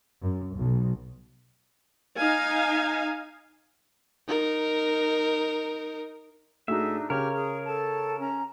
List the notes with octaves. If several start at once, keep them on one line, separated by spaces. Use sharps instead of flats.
F#2
B1
D#4 F5 G#5
D#4 A#4
A2 D4 D#4 F#4 G#4 E5
C#3 G4 A#4 C#5 F6
G#4
A4 A5
C#4 A#5